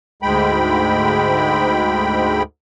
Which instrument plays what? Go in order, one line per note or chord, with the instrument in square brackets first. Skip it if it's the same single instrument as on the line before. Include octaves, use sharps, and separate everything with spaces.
[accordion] D2 G#2 G#3 G5 B5